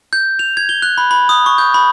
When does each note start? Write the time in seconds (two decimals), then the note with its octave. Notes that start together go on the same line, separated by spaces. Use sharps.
0.13 G6
0.39 F7
0.57 G#6
0.69 G7
0.82 F#6
0.98 B5
1.11 B5
1.29 D#6
1.46 C#6
1.58 G6
1.74 B5